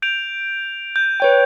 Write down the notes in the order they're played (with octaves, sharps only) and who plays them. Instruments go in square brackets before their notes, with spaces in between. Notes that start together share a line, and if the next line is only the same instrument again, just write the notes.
[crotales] G6 D7 F7
G6
[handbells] B4 C#5 G5